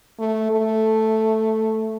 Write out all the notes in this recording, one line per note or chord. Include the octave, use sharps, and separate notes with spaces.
A3
A3